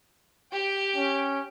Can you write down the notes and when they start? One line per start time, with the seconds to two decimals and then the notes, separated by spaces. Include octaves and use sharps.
0.52 G4 G5
0.96 C#4